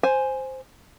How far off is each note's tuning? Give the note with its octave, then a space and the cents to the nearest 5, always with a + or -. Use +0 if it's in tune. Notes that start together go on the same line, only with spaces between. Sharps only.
C5 +0 G#5 +0